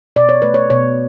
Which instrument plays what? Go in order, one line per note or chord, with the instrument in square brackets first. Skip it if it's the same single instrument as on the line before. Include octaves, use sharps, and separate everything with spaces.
[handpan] B2 D5
C#5
A3 B4
C#5
B2 C#5